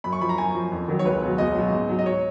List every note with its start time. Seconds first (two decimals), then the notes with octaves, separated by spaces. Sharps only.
0.04 F#2 B5
0.13 C#6
0.21 F3 B5
0.29 A#5
0.38 F#2 G#5
0.55 F3
0.72 F2
0.88 D#3 F#3
0.99 C#5
1.05 C#2 B4
1.22 B2 F#3
1.38 C#2 D#5
1.55 B2 F#3
1.72 G#2
1.89 F#3
1.99 D#5
2.06 C#5